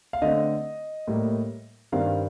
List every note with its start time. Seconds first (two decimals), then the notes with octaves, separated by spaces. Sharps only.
0.13 F5
0.22 D3 A3 C4 D#5
1.07 A2 G3 A#3
1.92 G2 D#3 G3 C4 F5